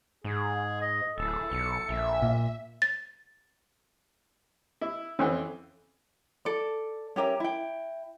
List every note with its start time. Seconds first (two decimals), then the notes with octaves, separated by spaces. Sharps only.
0.24 G#2 G#4
0.82 D#5
1.18 D1 E4 G#4 A4
1.52 B1 C#7
1.89 A#1 E5
2.22 A#2
2.82 A6
4.81 E4
5.19 F2 E3 C4 C#4
6.45 A4 D5
7.16 C#4 G4 A#4 E5
7.40 E4 G5